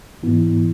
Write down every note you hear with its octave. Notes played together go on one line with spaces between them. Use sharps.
G#2 E3 B3 E4